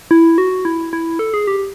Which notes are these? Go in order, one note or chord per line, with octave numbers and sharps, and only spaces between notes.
E4
F#4
E4
E4
A4
G#4
G4